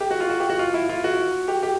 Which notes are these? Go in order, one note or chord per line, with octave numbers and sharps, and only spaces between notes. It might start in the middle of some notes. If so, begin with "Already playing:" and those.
G4
F#4
F4
F#4
G4
F#4
F4
E4
F4
F#4
G4
G4